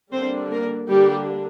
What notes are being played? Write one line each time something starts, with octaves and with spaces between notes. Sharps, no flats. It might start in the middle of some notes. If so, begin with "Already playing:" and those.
D3 G3 A#3 C4 D4 C5
A#3 A#4
D3 G3 A#3 D4 G4